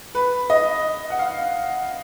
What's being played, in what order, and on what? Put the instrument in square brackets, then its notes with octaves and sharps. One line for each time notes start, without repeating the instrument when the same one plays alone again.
[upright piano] B4
D#5
F#5
F5